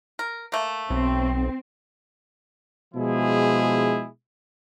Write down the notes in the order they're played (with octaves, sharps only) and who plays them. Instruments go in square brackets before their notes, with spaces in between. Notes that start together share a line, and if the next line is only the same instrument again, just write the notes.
[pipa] A#4
A3 A#3
[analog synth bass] B1 [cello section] C4
[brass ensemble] B2 F3 G#3 E4 G#4